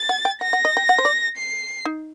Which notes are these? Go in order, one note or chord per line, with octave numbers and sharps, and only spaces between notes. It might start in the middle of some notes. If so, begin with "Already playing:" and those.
Already playing: A6
F#5
G5
F#5 A#6
F#5
D#5
G5
F#5
C5
D5
C7
D#4